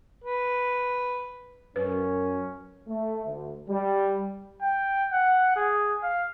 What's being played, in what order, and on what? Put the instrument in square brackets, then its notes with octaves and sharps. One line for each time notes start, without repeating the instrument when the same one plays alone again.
[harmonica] B4
[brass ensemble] F#2 [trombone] C#4 [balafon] B4
[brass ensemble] A3
D2
G3
[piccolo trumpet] G5
F#5
G#4
F5